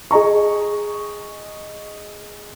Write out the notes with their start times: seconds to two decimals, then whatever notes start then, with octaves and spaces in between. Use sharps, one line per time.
0.11 G#4 D#5 A#5 C#6